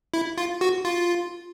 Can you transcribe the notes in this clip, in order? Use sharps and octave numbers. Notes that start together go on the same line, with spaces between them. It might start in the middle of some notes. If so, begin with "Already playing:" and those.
E4
F4
F#4
F4